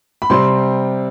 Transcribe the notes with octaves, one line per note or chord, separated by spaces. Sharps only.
B5
C3 G3 C4 C6